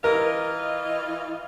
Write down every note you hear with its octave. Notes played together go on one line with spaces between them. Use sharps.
E3 F4 A#4 D#5